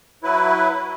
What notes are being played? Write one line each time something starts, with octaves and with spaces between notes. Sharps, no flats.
F#3 E4 B4